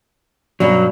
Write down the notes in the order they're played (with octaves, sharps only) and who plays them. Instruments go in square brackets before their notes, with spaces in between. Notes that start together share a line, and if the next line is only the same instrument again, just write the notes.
[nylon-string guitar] G2 B2 C#4 [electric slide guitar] F#3